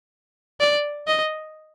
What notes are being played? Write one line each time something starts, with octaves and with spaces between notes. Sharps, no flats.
D5
D#5